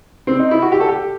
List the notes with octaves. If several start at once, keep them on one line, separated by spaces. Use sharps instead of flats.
C4
D#4
E4
F#4
G4
A4
G4